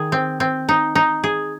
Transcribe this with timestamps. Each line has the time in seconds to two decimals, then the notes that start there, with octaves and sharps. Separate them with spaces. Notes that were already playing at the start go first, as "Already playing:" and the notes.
Already playing: D#3 G#4
0.12 C4
0.40 C4
0.69 D#4
0.95 D#4
1.24 G#4